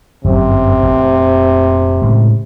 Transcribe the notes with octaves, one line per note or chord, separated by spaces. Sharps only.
G1 F#2 C3 F#3
F1 A#2
A2 C#3 G#3